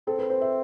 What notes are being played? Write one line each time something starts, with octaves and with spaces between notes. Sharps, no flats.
C4 A4
B4
C5
E5